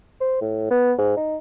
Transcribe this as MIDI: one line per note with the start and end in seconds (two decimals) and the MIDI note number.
0.21 0.38 72
0.41 0.69 45
0.71 0.93 59
0.98 1.16 44
1.17 1.37 63